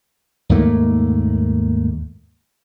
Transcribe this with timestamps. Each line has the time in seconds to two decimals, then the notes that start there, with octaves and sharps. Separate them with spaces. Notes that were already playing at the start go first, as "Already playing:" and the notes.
0.49 D#2 G#2 A3 A#3